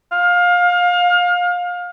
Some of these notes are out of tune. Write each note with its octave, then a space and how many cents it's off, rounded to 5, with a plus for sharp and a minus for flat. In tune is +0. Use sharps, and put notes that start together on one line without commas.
F5 +25